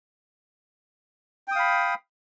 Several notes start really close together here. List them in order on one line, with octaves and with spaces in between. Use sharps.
G5 D#6 F5 B5